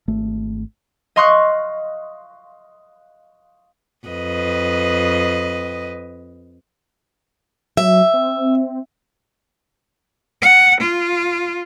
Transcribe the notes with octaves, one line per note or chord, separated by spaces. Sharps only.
G#1 A3
D#5 F5 C6 C#6 D#6 F#6
F2 B4 D#5
F#3 E5
C4
F#5
F4